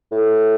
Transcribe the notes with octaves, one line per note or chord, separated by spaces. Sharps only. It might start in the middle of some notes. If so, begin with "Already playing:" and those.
A2